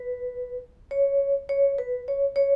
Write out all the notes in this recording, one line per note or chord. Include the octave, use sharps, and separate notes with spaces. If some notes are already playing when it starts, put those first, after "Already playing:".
Already playing: B4
C#5
C#5
B4
C#5
C#5